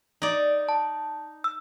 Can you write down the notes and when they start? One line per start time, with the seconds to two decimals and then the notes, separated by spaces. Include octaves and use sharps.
0.22 D#4 D5
0.69 A5
1.44 E6